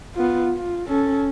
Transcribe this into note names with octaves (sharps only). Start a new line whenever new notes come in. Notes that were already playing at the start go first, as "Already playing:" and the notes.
B3 F4
F4
C#4 A4